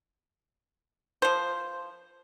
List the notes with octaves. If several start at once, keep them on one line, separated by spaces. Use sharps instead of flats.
F3 C5